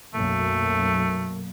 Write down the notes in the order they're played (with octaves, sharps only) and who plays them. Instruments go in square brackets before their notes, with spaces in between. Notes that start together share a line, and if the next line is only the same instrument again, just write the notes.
[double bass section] B1 F#2 A#3 [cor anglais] A3